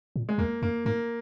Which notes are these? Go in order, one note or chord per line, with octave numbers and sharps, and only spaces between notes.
A#2
G#3
E2 A#3
F#2 A#3
G#2 A#3